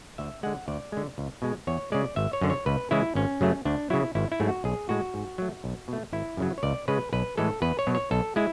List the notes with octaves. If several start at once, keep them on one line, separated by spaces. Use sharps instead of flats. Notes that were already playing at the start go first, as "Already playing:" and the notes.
D2 E5
D3 G#3 F#5
D2 D5
D3 G#3
C#2
B2 G#3
E2 C#5
C#3 G#3 D5
G#1 E5
C#5
F#2 D3
C#5
C#2 B4
C#3 E3 G#3 E4
G#1 C#4
F#2 C#3 F#3 A3
D2 D4
C#3 F#3 E4
G#1 E4
E4
G#2 F#3 A3
F#4
B1 G#4
A2 G#3 F#4
G#2
F#3 A3
B1
B2 A3
G#1 E4
F#2 C#3 F#3
C#5
C#2 D5
C#3 G#3 B4
B1 B4
A2 E3 G#3 A4
E2 B4
C#5
B2 F#3
C#5
B1 A4
G#3 E4